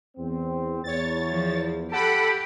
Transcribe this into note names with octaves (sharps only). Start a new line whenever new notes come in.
E2 C4
E2 C#5 A6
F3
G4 A4 F#5 B5